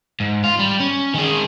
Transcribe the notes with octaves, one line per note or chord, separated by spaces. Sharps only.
G#2
F4
G3
C#4
D#3 G#4